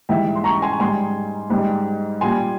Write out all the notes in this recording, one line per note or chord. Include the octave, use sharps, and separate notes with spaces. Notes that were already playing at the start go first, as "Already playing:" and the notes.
G#2 E3 G3 E5 G5
C6
A#5 C#6
G#5 C6
G#2 G3 G#5 C6
G#2 G3
A#2 G3 G#5 C6